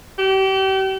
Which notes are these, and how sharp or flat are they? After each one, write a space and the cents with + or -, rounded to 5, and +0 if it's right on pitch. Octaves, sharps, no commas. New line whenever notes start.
G4 -35